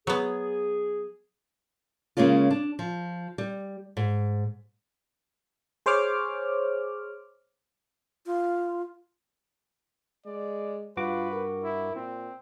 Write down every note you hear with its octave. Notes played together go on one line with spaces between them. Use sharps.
F#3 B3 G#4
C#3 G#3 A#3 C#4 F4
D4
F3
G3
G#2
G#4 C5 C#5 D6 F6
F4
G#3 D5
G2 F4 F#4 B4 D6
A#4
E4
A#2 C4